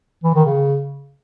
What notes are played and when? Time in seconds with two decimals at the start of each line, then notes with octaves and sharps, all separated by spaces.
0.24 E3
0.35 D#3
0.45 C#3